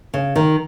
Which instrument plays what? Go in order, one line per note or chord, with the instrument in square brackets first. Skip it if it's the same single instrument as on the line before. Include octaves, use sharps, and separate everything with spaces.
[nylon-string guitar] C#3
D#3